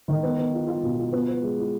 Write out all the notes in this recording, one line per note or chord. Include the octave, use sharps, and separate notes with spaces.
D#3
B3
B3
F4
F4
B2
F4
B3
B4
G#3
F4